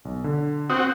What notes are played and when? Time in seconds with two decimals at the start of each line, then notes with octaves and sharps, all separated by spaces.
0.05 B1
0.24 D3
0.70 C4 F#4 D#6 G6